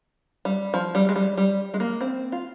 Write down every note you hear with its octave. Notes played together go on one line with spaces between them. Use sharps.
G3
F3
G3
G#3
G3
G3
G#3
A#3
C4
F4